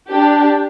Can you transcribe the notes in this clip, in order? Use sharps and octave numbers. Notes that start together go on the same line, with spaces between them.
D4 G4